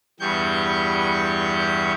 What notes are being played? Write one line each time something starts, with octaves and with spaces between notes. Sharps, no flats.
E2 G2 G3 C#6 G6